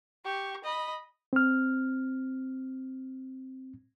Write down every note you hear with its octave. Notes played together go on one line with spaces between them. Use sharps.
G4 C#6
D#5 B5
C4 F6